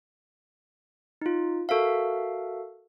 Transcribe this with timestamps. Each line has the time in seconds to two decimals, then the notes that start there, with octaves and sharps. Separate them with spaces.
1.21 D#4 F4
1.69 F#4 A4 A#4 E5 F5